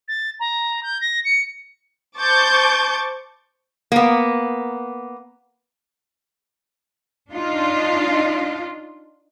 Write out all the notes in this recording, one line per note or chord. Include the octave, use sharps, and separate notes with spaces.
A6
A#5
G6
A#6
C#7
C5 A5 C#6 D6 G6 A6
A#3 B3
D4 D#4 F4